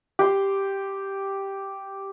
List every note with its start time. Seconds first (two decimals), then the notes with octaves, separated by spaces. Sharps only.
0.19 G4 C6